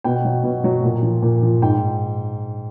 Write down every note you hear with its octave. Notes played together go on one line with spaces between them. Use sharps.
B2 G5
F#3
B2
F#3
A#2
F3
A#2
F3
G#2 G5